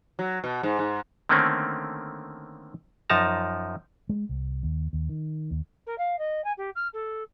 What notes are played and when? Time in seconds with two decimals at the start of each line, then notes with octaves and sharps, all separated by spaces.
0.19 F#3
0.44 B2
0.63 G#2
0.79 G#2
1.29 D3 D#3 A3 A#3 C4 C#4
3.10 F#2 F3 D#4 A5 A#5
4.09 G#3
4.29 C2
4.63 D#2
4.93 D#2
5.09 D#3
5.51 D#2
5.86 A#4
5.98 F5
6.18 D#5
6.44 G#5
6.57 G4
6.75 F6
6.93 A4